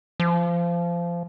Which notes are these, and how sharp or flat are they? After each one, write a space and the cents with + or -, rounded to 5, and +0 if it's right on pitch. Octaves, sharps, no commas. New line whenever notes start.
F3 -20